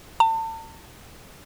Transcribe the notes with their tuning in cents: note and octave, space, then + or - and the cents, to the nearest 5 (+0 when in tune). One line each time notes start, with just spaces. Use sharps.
A5 +35